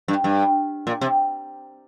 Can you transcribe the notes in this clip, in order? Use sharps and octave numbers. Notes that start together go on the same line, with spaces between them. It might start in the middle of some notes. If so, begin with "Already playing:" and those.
G2
G2
A#2
C3